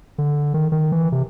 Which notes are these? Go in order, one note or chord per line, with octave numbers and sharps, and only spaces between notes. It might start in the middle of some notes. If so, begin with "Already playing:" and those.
D3
D#3
D#3
E3
C3